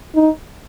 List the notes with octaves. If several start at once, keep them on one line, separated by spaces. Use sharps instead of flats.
D#4